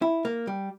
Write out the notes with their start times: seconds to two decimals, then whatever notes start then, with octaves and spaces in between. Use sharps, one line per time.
0.02 E4
0.25 A#3
0.47 G3